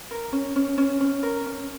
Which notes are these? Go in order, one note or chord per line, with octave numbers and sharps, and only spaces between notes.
A#4
C#4
C#4
C#4
C#4
A#4
C#4